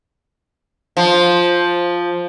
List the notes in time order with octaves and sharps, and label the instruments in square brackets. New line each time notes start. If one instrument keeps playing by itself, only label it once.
[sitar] F3